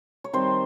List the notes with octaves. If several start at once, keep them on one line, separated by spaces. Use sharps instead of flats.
C#5
D#3 G3 C4 C5